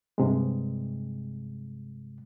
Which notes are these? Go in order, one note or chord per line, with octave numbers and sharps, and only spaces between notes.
G2 C3 G#3